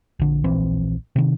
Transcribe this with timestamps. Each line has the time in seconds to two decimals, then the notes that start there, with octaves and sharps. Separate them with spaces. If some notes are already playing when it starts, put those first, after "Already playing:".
0.19 A#1 D3
0.44 D1 A#1 E3 C4
1.16 C3 D#3